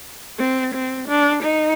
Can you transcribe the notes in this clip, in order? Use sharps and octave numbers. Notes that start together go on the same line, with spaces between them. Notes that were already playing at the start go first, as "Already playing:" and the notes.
C4
C4
D4
D#4